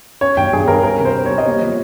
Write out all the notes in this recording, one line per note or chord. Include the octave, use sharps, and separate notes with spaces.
C#4 C#5
G2 G5
G2 G#4
G2 A#4
C#4 A#4
C3
C5
C#4
C#5
G3
D#5
A#3 C#5
F3